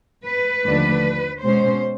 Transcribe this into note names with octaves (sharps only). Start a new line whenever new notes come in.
B4
D#2 D3 F3 A3 D4
B2 G#3 C#4 C5